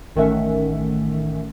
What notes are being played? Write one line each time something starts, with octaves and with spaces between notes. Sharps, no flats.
A1 D#3 A3 C#4 E5 F#5